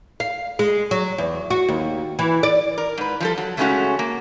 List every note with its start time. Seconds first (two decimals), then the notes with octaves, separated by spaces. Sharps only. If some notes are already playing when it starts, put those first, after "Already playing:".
0.20 F5
0.59 G#3
0.91 F#3
1.18 E2
1.50 F#4
1.68 D#2
2.19 E3
2.43 D5
2.78 A#4
2.98 G#2 B4
3.20 F3 G3 A4
3.38 F#3
3.57 C#3 G#3 A3 C4 C#4 F#4
3.99 A#3